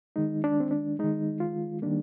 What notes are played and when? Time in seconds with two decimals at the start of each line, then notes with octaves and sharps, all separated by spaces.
0.16 D#3 G#3 D#4
0.44 D4
0.60 C4
0.71 D4
0.99 D#3 G#3 D#4
1.40 F4
1.82 D#3 G3 A#3 D4